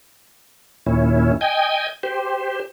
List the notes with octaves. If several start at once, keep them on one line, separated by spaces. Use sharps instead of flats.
D#2 A#2 C#4 E4
D#5 G5 G#5
G4 C5